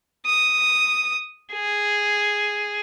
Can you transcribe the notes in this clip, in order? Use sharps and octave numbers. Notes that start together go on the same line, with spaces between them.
D#6
G#4